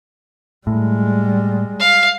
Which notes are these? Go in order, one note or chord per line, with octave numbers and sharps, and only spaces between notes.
A2 G3 G#3
F5